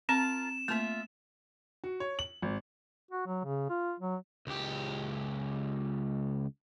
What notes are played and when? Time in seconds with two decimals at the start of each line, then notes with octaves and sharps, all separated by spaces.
0.09 C4 F4 A#4 A5 E7
0.68 A3 A#3 F4 E5
1.84 F#4
2.00 C#5
2.19 F#7
2.42 G#1
3.11 F#4
3.26 F#3
3.44 C#3
3.69 F4
4.00 F#3
4.47 C#2 G4